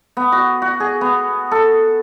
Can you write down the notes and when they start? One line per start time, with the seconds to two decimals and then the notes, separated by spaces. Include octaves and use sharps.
0.17 B3
0.32 F#4
0.62 F#4
0.80 G#4
1.01 B3
1.51 A4